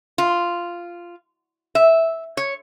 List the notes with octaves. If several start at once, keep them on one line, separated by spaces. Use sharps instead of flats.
F4
E5
C#5